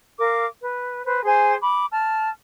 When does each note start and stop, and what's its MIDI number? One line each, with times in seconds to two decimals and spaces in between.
0.20 0.45 70
0.20 0.45 77
0.20 0.45 86
0.61 1.02 71
1.06 1.22 71
1.06 1.22 72
1.25 1.55 68
1.25 1.55 72
1.25 1.55 80
1.25 1.55 84
1.61 1.85 83
1.61 1.85 86
1.92 2.29 81
1.92 2.29 89